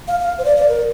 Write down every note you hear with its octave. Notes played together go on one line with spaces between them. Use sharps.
F5
F5
C5
D5
D5
A#4